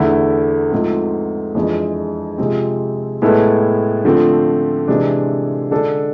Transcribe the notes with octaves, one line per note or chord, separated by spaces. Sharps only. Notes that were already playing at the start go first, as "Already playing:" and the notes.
Already playing: E2 D3 A3 E4
G#2 F3 A3 C4
F2 E3 G#3 D4
C3 F3 G#3 C4
A2 G#3 B3 E4 A4
D3 F3 A3 C4
C3 E3 G#3 D4
D3 G#3 D4 A4